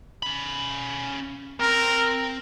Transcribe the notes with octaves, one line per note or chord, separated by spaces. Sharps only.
C#4 B5
C4 A#4